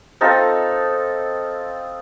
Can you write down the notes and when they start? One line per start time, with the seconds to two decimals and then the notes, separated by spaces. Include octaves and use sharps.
0.21 C4 D#4 F4 A4